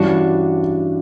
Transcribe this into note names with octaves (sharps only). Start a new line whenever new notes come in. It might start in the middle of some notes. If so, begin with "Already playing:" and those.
Already playing: G2 E3 G3 C#4 D4 F#4